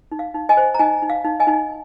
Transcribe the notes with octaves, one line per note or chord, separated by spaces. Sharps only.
D#4
F5
D#4
D#5 G#5
C5
A#5
D#4 D#5 G#5
D#4 G#5
F5
D#4
D#5 G#5
D#4